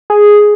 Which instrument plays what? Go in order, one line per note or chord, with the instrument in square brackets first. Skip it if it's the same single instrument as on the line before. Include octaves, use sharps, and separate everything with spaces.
[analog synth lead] G#4